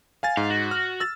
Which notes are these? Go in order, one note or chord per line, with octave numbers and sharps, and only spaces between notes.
F5 G#5 A6
G#2 F5
F#4
F6
E6 A6